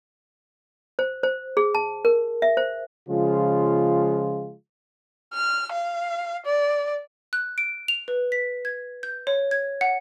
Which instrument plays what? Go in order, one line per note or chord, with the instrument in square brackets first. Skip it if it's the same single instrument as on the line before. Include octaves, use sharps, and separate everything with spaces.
[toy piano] C5
C5
G#4
A5
A#4
E5
C5
[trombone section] C#3 F3 G#3 F4
[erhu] F6
F5
D5
[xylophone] F#6
D7
F7
B4
B6
G#6
G6
C#5
G#6
F#5